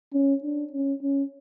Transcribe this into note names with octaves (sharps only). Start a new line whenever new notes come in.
C#4
D4
C#4
C#4